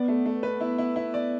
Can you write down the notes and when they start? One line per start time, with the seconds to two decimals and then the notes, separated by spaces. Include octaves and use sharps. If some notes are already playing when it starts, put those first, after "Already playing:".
Already playing: B3 D5
0.08 A3
0.26 A3
0.43 B4
0.61 E4
0.78 E4
0.96 E4
1.14 D5